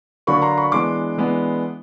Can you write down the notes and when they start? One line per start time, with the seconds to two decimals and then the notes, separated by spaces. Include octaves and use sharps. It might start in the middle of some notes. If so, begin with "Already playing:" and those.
0.27 D3 F#3 A#3 D4 B5 C#6
0.42 A#5 C6
0.57 B5 C#6
0.72 E3 G#3 B3 D4 C6 D6
1.17 E3 G#3 B3 D4